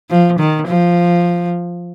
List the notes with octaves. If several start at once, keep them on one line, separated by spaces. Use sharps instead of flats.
F3
D#3
F3